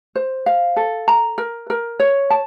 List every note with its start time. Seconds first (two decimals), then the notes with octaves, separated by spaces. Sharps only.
0.15 C5
0.46 F5
0.76 A4
1.08 A#5
1.38 A#4
1.70 A#4
2.00 C#5
2.30 A5